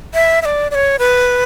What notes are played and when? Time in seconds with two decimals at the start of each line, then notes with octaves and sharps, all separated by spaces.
0.14 E5
0.42 E5
0.45 D5
0.71 D5
0.75 C#5
0.99 B4